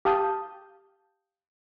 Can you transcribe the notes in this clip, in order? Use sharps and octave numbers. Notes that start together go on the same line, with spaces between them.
G4 F5 A5 D#6 G6